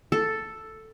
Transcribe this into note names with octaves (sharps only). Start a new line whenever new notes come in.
A4